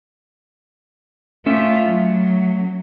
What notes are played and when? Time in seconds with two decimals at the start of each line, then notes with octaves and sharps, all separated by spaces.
1.46 A3 C#4 F4 E5
1.88 F#3